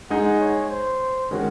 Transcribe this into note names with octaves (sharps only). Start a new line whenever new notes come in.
G#3 D#4 G#4 F#5
C#5
C5
D#3 G#3 C#4 F#4